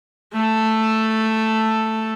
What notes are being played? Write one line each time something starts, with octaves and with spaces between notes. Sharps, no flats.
A3 A4